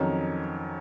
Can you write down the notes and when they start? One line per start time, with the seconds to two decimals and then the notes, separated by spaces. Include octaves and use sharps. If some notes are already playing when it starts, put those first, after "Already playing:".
Already playing: F2 D#3 F#3 C#4